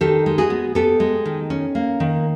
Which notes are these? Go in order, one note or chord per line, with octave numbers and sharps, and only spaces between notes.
D#3 G4 A4
G#3
F#4 G#4
B3
B3 G4 A4
G#3
D#3
C#4
A#3
D#3